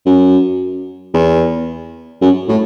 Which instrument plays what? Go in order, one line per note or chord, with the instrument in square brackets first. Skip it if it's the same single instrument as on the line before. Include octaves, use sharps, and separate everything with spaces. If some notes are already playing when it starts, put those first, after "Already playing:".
[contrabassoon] F#2
E2
F#2
A2